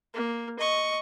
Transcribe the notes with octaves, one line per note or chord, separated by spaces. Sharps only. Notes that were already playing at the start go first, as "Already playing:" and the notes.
A#3
D#5 C#6